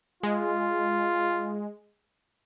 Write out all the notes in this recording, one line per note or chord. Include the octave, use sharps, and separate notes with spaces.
G#3 F4